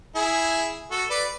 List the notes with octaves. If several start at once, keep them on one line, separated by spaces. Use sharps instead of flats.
E4 G#4
F#4 A4
B4 D5